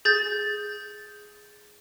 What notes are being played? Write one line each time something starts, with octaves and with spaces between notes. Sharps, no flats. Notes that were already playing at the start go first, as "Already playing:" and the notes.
G#4 G6 A6